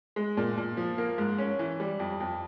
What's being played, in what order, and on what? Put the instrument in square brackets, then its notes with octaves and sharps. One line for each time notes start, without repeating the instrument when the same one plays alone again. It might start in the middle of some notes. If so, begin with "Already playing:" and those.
[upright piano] G#3
A#2
A#2
F3
A#3
G#2
C#4
E3
G3
F2
F2